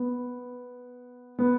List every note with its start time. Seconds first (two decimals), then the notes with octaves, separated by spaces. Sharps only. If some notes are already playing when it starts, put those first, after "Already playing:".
Already playing: B3
1.39 B3